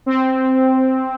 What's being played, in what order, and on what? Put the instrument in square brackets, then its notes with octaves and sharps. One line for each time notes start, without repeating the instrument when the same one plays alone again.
[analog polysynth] C4